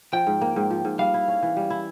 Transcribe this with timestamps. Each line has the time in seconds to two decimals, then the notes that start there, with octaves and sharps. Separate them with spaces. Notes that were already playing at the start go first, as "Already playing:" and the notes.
0.13 F3 G5
0.27 G#2
0.41 A#3
0.56 G#2
0.70 F3
0.85 G#2
0.99 G3 F5
1.14 E4
1.28 C#4
1.42 E3
1.57 G3
1.70 E4